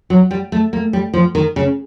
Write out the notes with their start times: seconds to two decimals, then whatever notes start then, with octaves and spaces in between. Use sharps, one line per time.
0.10 F#3
0.31 G3
0.52 A3
0.73 A#3
0.93 G3
1.14 F3
1.35 D#3
1.56 C#3